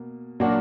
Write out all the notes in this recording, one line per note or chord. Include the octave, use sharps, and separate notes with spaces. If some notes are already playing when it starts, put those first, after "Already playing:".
Already playing: B2 A#3
A#2 F#3 A#3 D4 F#4